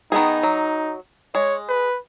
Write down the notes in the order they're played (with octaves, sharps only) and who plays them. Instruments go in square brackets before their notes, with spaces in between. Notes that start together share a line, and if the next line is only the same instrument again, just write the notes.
[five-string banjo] D#3 B3 G#4 [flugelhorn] D#4
[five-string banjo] F#3
[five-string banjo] G#3 [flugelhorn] C#5
[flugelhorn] B4